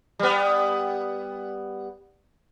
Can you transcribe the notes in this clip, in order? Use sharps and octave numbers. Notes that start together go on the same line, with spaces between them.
G3 B3